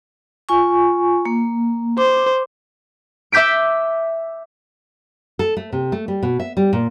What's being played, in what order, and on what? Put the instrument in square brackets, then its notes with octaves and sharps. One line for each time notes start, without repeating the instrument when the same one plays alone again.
[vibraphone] F4 G#5 C#6
A#3
[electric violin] C5 [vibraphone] D6
[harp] E5 D6 G6 B6 D7
[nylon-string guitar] A4
A3
C3
A3
G3
B2
E5
G3
A#2